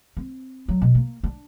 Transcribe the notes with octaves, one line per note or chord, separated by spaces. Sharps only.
C4
F#3
B2
A#3
D4